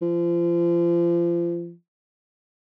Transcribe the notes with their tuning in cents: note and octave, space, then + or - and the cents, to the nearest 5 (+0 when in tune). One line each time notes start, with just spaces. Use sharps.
F3 -30